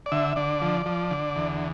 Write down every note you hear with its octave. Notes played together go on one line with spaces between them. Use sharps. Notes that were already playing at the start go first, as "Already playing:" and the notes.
D5
D3 E5
D3 D5
F3
F3
D3
E2